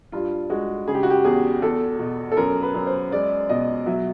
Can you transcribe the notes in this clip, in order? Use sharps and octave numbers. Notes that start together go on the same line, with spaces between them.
G2 F4
G#3 F#4
C#3 G#4
G4
F#4
G4
E2 G#4
E2 A4
B2
A4
F#2 A#4
B4
F#2
C5
G#3 D5
B2 D#5
F#3 E5